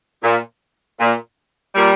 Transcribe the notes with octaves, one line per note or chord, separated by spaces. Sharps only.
A#2
A#2
A#2 G3